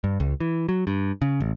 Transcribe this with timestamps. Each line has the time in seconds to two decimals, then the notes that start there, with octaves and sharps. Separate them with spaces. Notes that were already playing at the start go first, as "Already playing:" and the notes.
0.04 G2
0.20 C#2
0.40 E3
0.69 F#3
0.87 G2
1.22 C#3
1.40 A1